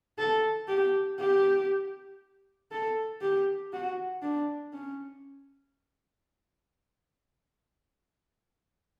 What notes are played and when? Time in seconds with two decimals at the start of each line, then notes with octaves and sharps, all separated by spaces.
0.18 A4
0.68 G4
1.19 G4
2.71 A4
3.21 G4
3.73 F#4
4.22 D4
4.73 C#4